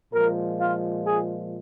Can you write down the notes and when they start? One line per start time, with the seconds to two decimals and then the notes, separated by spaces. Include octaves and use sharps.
0.13 A#2 F3 G#3 A#4
0.60 F4
1.05 G#4